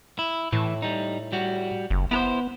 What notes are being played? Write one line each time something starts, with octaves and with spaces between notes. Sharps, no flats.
E4
A2 E3
G3 D#4
G3 F#4
F#1
B3 E4 A#4 C5